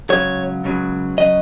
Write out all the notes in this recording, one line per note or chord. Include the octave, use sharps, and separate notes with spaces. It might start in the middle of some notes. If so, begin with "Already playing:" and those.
C#2 C#3 F#3 C#5
C#2 C#3 F#3
C#3 F#3 D#5